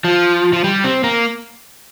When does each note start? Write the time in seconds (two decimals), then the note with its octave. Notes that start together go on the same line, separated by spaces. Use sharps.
0.04 F3
0.53 F3
0.64 G3
0.84 C4
1.04 A#3